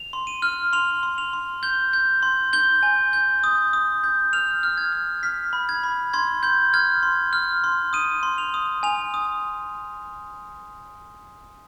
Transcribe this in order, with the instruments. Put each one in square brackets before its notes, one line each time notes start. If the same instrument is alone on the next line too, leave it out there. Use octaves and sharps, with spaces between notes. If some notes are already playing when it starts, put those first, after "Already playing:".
Already playing: [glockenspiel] F7
C6
D#7
F6
C6 F7
C6
F7
C6
G6 G7
G6
C6
G6 G7
G#5
G6
D#6
D#6
G6
F6 F7
F6
G#6
F6
F6 B6
B5
G#6
B5
C6 G#6
C6 G6
F6 G#6
C6
F6
C6
D#6 D#7
C6
F7
D#6
G#5 F7
D#6